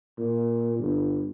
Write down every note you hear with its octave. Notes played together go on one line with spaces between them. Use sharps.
A#2
G1